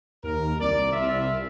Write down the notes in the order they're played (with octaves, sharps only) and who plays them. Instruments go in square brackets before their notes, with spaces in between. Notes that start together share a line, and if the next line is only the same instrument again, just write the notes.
[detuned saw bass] D#2 [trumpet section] A#4
[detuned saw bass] C2 [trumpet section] D5
[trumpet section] F4 E5